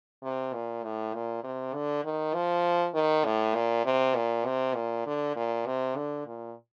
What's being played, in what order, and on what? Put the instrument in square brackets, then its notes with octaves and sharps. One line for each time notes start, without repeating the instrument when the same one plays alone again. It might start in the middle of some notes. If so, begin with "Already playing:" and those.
[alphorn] C3
A#2
A2
A#2
C3
D3
D#3
F3
D#3
A2
A#2
C3
A#2
C3
A#2
D3
A#2
C3
D3
A#2